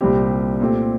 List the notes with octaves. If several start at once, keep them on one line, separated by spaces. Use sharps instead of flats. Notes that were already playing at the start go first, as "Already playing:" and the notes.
C2 A#2 G3 C4 G4
A#2 A3 C4 G4